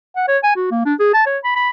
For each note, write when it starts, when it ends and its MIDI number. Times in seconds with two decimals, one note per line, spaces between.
0.16 0.26 78
0.28 0.38 73
0.43 0.54 80
0.56 0.67 66
0.71 0.82 58
0.85 0.94 62
0.99 1.10 68
1.13 1.25 81
1.26 1.38 73
1.44 1.55 83
1.56 1.70 83